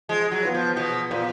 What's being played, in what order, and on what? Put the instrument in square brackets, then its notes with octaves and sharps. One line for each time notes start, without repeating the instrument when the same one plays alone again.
[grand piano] F3 [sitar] G#3
[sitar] F#3
[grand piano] B3 F4 B4
[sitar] F3
[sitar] B2 [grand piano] F3
[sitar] A#2 [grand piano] B3 F4 B4